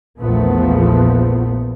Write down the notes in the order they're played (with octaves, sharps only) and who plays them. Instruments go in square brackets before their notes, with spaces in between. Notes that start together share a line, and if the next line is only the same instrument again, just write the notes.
[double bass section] A#1 E2 A#2 F3 A3 B3